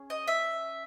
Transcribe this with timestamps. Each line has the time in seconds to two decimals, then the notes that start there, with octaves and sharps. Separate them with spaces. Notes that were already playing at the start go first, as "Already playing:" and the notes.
Already playing: C#4 G#4
0.10 D#5
0.28 E5